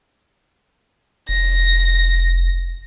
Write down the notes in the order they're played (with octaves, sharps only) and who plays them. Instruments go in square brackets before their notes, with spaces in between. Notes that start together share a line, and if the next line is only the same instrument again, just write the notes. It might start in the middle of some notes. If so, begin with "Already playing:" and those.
[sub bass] F1 [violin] A#6